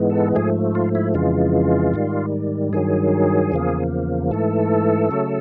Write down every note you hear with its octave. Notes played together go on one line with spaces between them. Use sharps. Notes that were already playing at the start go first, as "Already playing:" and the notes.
Already playing: G#2 E3 G#3 B3
A4
G#2 F3 A3 G#4
F4
E4
F2 C#3 E3 G#3 F4
G#2 D#3 G3
G2 D#3 F#3 G#4
E2 C#3 F3 A#3
G#2 E3 A3 A4
C#3 F#3 A3